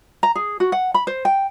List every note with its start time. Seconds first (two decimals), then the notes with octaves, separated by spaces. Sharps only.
0.23 A#5
0.35 G#4
0.60 F#4
0.72 F#5
0.94 B5
1.07 C5
1.25 G5